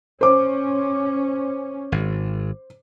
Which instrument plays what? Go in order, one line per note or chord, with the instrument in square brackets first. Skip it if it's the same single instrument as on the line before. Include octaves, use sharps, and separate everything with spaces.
[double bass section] C#4 [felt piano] C5 D6
[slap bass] G#1